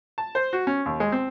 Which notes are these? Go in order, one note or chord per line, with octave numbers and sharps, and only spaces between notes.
A5
C5
F#4
C#4
D#2
G#3
C4